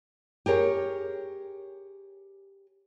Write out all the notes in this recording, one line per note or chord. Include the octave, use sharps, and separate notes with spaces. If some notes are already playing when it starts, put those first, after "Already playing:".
G4 G#4 A#4 C#5